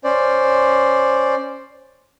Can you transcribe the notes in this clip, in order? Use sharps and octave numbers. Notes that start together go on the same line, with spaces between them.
C#4 C5 D5